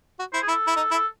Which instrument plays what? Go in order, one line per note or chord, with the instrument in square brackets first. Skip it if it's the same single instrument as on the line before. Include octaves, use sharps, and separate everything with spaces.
[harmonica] F#4
[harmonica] E4 [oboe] C5
[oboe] G#4
[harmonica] E4 [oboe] A4
[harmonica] E4
D#4
E4
[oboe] A4